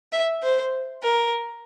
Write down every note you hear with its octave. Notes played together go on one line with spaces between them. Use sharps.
E5
C5
A#4